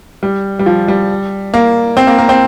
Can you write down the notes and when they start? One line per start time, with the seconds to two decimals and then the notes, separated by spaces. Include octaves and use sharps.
0.23 G3
0.59 G3
0.66 F3
0.88 G3
1.54 A#3
1.97 C4
2.07 A#3
2.18 A#3
2.29 C4